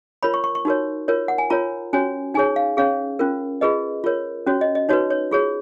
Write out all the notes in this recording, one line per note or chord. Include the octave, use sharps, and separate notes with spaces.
F4 A#4 C#5 B5
C#6
C#6
C#6
D#4 F#4 A#4 C#5
F4 A#4 C#5
F#5
G#5
F4 A#4 C#5 A#5
C#4 F#4 C#5 G#5
D#4 G#4 C#5 G#5
F5
C#4 G#4 C#5 F5
C#4 F4 A#4
F4 G#4 B4 D#5
F4 A#4 C#5
C#4 F#4 C#5
D#5
D#5
D#4 F#4 B4 C#5
C#5
F4 G#4 C#5